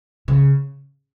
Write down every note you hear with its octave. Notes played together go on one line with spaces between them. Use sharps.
C#3